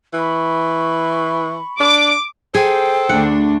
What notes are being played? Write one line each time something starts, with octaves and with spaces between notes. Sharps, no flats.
E3 B5 C#6
D4 D6
G#4 A4 C5 G5
D2 D4 F#5